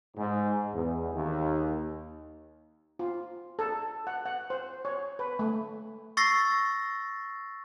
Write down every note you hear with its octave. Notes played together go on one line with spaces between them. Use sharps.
G#2
E2
D#2
F4
A4
F#5
F#5
C5
C#5
B4
A3
C#6 E6 A6 A#6 C7